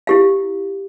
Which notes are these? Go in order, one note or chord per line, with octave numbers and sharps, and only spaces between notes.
E4 G4 F5